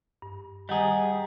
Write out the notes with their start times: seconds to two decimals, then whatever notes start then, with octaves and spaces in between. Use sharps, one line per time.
0.22 G2
0.69 D#3 G3 G#4 D#5 F#5 A#5